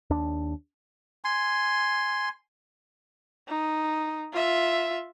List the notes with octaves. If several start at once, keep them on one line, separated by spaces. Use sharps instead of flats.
D#2 D4
G#5 C6
D#4
F4 E5